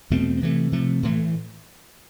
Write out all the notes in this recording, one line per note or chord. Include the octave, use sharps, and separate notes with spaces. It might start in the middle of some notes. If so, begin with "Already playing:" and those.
E2 B2 A3 C4
C3 E3 A3
C3 F3 A3
A2 E3 A3